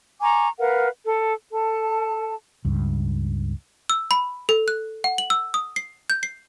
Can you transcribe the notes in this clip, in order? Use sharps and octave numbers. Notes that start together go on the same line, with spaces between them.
G#5 A#5 C#6 D6
A#4 B4 F5 F#5
A4
A4 A5
C#2 G2
E6
B5
A4
F#6
F#5
F#7
E6
D#6
C7
G6
C7